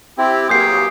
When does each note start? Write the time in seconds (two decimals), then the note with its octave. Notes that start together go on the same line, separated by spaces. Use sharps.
0.18 C4 E4 G4
0.49 B1 F#3 A#3 G4 G#4 D#6 G6 C7